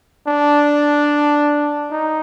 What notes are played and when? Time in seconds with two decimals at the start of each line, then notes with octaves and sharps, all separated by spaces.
0.27 D4
1.91 D#4